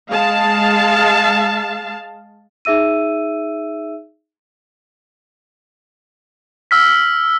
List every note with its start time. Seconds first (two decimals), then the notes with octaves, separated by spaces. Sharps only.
0.10 G#3 F5 A5
2.65 D#4 G#4 E5 E6 D#7
6.71 E6 F6 B6